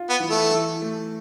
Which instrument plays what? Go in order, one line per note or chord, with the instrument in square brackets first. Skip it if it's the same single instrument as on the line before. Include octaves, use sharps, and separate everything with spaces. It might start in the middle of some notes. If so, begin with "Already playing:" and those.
Already playing: [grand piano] F4
[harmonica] B3
[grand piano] E3
[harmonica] A3
[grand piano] E3
A3